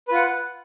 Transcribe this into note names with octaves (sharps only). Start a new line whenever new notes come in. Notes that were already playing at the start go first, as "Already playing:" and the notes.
F4 B4 F#5